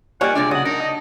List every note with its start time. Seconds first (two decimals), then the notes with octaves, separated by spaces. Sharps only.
0.21 D#3 G3 A#3 F4 C#5 D5 F#5 G#5
0.35 C3 G#3 D4 D5
0.51 C#3 F#3 F#5 D#6
0.65 D4 D#4 A#4
0.80 D#5